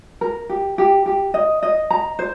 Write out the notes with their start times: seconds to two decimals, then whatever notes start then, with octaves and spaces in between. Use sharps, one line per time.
0.21 A#4
0.49 G4
0.78 G4
1.06 G4
1.34 D#5
1.63 D#5
1.90 A#5
2.19 C5